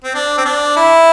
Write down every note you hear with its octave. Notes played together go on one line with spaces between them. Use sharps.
C4
D4
C4
D4
E4